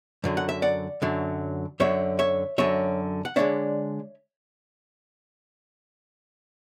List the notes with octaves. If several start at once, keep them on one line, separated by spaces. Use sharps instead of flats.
F#2 D3 F#3
F#5
E5
D5 F#5
F#2 D3 F#3
F#2 D3 F#3 C#5 E5
C#5 E5
F#2 D3 F#3 C#5 E5
F#5
D3 G#3 D4 C#5 E5